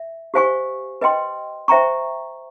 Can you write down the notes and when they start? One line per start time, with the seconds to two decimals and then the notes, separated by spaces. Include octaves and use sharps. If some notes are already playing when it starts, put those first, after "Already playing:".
Already playing: E5
0.34 G4 C5 F5 G#5 C#6
1.01 B4 D#5 G5 C6
1.68 C5 E5 G5 A#5 C#6